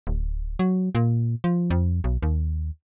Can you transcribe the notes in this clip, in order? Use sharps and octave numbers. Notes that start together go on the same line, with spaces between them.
D1
F#3
A#2
F3
F2
B1
D#2